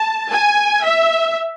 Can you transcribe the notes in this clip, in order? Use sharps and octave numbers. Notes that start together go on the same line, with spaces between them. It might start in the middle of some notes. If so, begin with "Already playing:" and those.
Already playing: A5
G#5
E5